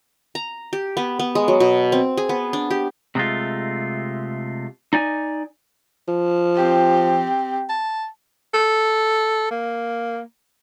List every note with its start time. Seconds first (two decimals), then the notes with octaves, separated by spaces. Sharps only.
0.35 A#5
0.73 G4
0.97 B3
1.19 B3
1.35 G#3
1.48 F#3
1.60 B2
1.92 C4
2.17 G#4
2.29 B3
2.53 D4
2.71 G4
3.15 C3 G#3 A3 F4
4.93 D#4 D5 G#5
6.08 F3
6.55 C4 G4
7.69 A5
8.54 A4
9.51 A#3